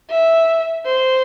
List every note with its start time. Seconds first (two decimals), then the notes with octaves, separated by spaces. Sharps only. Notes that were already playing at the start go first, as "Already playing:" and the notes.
0.10 E5
0.86 C5